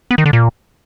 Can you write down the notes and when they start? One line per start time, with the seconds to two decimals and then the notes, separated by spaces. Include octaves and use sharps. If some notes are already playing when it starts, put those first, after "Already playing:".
0.11 B3
0.18 D#3
0.26 D3
0.33 A#2